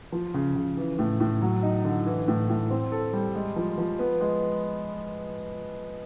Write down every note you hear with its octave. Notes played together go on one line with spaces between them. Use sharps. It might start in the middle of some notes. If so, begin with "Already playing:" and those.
F3
C#3
C#3
E3
A2
A2
F#3
D#4
D3
E3
A2
A2
C4
A4
G3
G#3
F3
F3
B3
G#3